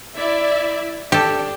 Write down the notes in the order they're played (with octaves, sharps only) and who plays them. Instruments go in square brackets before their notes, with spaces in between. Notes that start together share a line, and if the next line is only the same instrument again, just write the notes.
[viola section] E4 D5 E5
[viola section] D4 [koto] G4 A4